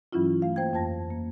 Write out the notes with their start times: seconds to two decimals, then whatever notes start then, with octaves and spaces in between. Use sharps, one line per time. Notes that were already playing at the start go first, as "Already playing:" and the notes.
0.13 G2 E3 F#3 C#4 E4 F4
0.42 A3 F5
0.56 A#3 C5 G5 G#6
0.73 F2 F4 C5 A5 A#6
1.10 A#3